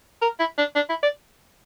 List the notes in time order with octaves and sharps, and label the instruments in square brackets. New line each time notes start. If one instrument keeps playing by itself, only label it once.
[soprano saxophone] A#4
E4
D4
D4
E4
D5